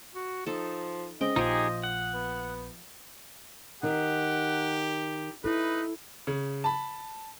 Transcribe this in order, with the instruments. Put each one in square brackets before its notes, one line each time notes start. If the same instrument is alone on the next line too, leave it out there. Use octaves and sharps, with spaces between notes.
[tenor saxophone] F#4
[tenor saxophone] F3 [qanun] D#4 A4
[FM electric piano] C#3 G#3 C4 [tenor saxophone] D#5 [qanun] G5
[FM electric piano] A#1 D#6 G6 [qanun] F3 [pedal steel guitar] D#4 G4 G#4
[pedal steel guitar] F#5
[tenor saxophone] B3
[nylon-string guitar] D#3 D#4 [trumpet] G4 [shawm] F#5
[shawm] D#4 [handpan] E4 A4 [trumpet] B4
[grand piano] C#3
A5 B5